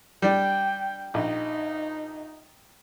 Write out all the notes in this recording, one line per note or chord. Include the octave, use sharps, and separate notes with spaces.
G3 D4 G5
A#1 D#4